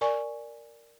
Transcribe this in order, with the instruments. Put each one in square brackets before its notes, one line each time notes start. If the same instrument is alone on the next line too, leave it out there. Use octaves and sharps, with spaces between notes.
[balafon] A#4 D5 G#5 C#6